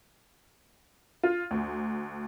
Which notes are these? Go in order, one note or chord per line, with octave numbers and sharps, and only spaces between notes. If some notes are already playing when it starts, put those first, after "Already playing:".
F4
D2